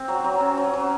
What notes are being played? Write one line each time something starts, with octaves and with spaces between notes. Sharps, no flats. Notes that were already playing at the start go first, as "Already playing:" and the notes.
Already playing: C4
F#3
F#3
C#4
F#3
F#3